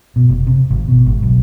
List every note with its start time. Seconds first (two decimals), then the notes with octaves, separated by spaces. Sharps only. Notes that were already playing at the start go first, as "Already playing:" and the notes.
0.16 B2
0.29 F1
0.47 C3
0.70 G#1
0.88 B2
1.06 G#1
1.23 B1